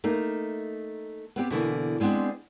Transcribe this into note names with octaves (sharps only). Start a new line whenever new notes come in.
A3 A#3 D#4
B3 C4 G4
B2 D3 E3 A#3
G3 G#3 B3 C4 D4